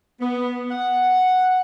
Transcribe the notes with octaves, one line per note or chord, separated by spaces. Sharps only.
B3
F#5